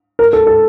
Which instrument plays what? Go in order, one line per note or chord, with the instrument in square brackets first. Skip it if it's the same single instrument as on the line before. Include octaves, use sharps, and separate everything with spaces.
[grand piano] A#4
A4
A4